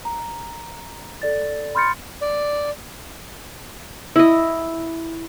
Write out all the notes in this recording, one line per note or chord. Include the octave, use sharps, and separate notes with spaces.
A#5
A4 D5 A6
B5 C6 F6 G6 A6 C#7
D5
E4 D#5